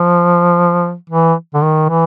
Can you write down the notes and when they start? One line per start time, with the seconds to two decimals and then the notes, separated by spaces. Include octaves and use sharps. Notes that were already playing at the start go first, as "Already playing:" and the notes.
Already playing: F3
1.10 E3
1.54 D3
1.63 D#3
1.89 E3